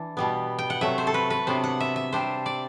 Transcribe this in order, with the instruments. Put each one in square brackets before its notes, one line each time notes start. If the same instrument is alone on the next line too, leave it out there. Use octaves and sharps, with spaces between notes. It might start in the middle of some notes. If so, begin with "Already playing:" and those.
Already playing: [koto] E3 D4
B2 G3 B3
G5
F#5
C3 F#3 A3 E5
C5
A4
B4
B4
C3 F#3 B3 D4 C5
F#5
E5
E5
C3 G3 D4 C5
D5